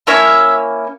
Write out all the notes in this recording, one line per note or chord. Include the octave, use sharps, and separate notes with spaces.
A#3 C#4 E4 C#5 E5